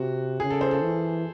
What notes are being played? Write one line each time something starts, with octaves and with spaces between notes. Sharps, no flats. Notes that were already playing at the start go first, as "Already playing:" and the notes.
Already playing: C3 F#4
C#3 G#4
A4
C5
A4
E3